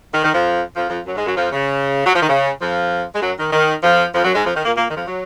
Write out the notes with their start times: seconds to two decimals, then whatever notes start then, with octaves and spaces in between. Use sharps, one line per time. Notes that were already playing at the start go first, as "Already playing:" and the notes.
0.13 D#3
0.24 D#3
0.33 F2 F3
0.75 F2 F3
0.90 F2 F3
1.06 F#2 F#3
1.16 G#2 G#3
1.26 F#2 F#3
1.37 F2 F3
1.52 C#3
2.06 F#3
2.14 F3
2.21 D#3
2.29 C#3
2.60 F2 F3
3.14 G#3
3.22 F#2 F#3
3.38 D#3
3.53 D#3
3.83 F2 F3
4.14 F2 F3
4.24 F#2 F#3
4.35 G#2 G#3
4.45 F2 F3
4.55 D#3
4.65 A#2 A#3
4.76 A#2 A#3
4.89 D#3
4.96 F2 F3
5.06 F#3